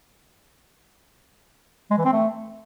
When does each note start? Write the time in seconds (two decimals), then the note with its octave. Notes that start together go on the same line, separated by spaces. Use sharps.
1.90 G#3
1.98 E3
2.05 C4
2.12 A3